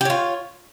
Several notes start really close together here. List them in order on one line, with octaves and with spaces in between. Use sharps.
G4 C#5 F4